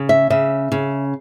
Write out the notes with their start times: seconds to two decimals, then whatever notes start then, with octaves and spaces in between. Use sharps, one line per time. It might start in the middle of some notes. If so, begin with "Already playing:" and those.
Already playing: C#3
0.09 E5
0.30 C#3 E5
0.72 C#3